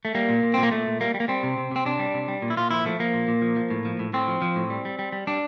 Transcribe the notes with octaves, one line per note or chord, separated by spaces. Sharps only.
A3
G3 A#3
A#2
A#2
A#2 C4
A#3
A#2 A3
A#2
G3 A#3
G3
A#3
G3 C4
C3
C3
C3 C4
C3 D4
G3
C3
G3
A#2
E4
A#2 F4
F3 E4
F3 A3
F3 A#3
A#2
A#2
F3
F3
A2
F3
A2
A2 C4
F3
F3
A2
G3
G3
G3
G3
G3 D4